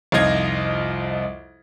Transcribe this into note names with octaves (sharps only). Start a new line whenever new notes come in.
C2 F2 D#4 F4 D#5 G#6